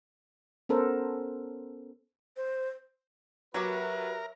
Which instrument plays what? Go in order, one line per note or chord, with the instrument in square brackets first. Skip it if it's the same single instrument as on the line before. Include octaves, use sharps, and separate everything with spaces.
[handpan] B3 C#4 A4 A#4 C5
[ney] C5
[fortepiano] F#3 [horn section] F#4 G4 B4 [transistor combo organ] A#4 [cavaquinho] C#5 E5 D6